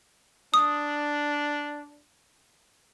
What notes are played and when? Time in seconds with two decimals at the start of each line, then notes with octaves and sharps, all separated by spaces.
0.54 D4 D#6